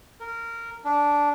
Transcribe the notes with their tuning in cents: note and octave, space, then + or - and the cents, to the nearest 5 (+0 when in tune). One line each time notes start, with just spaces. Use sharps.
A#4 -15
D4 -10